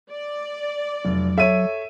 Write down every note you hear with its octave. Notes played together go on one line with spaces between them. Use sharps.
D5
F1 F#3
A4 C#5 E5 D#7